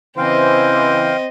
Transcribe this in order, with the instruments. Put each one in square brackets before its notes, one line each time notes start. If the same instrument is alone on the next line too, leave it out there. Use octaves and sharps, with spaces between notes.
[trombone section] C#3 E3 [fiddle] C4 D#5 [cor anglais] C5 [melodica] F5 G5